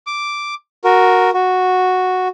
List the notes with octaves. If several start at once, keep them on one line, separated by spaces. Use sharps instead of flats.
D6
F#4 A#4
F#4